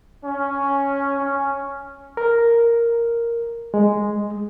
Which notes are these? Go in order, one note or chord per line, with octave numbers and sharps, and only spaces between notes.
C#4
C#4
A#4
G#3